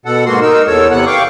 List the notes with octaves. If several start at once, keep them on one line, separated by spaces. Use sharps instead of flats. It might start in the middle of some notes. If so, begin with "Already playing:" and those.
B2 A4 F#5
G#2 A#3 F#4 C6
D#4 A#4 E6
E2 A4 C#5 E6
E2 C3 B3 F#5 F#6
F5 G5 C#6 D6